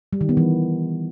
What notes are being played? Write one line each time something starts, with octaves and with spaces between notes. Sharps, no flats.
G3
D#3
B3
E3